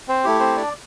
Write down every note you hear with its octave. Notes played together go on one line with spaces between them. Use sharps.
C4 C5
A3 E4 G4
C4 C5
D4 D5